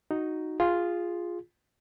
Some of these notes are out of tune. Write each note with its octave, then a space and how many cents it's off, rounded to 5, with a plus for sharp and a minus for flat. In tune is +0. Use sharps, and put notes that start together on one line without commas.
D#4 +0 F#4 +0
F4 +0 G#4 -15